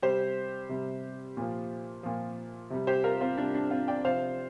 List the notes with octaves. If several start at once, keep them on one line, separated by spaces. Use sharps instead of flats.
C3 G3 G4 C5
C3 G3
A#2 F3
A#2 F3
C3 G3
G4 C5
F4 A#4
C4 F4
C3 G3 D4
D4
C4 F4
D5 G5
C3 F3 C5 F5